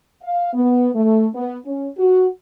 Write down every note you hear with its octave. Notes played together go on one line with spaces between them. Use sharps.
F5
B3
A3
B3
C#4
F#4